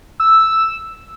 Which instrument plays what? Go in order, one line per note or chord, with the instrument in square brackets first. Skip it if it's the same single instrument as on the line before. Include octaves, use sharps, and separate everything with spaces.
[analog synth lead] E6